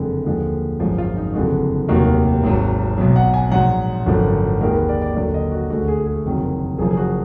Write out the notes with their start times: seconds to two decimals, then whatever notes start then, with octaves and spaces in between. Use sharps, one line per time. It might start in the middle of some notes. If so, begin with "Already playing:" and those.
Already playing: F#1 F2 D3 G#3
0.25 D#2 D3 F3 G#3
0.79 G#1 F#2 F3 G#3 F#4
0.98 F4
1.17 D#4
1.34 F#1 F2 D3 G#3 F#4
1.88 F1 D#2 D#3 F#3 F#4
2.43 G#1 G#2 F#3
2.98 B1 B2 F#3
3.16 F#5
3.34 G#5
3.52 A#1 G#2 F#3 F#5
4.06 G#1 F#2 D3 F3
4.61 D#2 D#3 G#3 A#4
4.74 B4
4.89 D5
5.02 D5
5.15 D#2 D3 F#3 D5
5.34 D#5
5.52 F#4
5.70 D2 D3 G#3 F#4
5.88 G#4
6.06 G#4
6.25 F#1 F2 D#3 F#3
6.78 F#1 F#2 F3 G#4
6.90 G#4
6.97 F#4